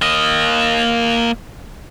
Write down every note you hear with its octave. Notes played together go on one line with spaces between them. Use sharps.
A#3 D#5